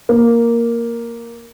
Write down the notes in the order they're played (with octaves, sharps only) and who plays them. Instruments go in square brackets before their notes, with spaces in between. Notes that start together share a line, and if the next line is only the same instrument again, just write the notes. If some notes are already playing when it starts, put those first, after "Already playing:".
[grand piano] A#3